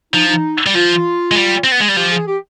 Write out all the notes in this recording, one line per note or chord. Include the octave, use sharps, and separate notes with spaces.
F3 D#4
D#4
G3
F3 F4
G#3
G3
C4
B3
G#3
G3
F3 G4
G#4
G4